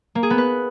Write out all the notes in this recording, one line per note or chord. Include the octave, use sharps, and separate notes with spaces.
A#3
G#4
B3
B4